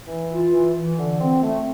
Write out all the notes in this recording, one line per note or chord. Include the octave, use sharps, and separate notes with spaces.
E3
F4
E3
E3
D3
C4
A3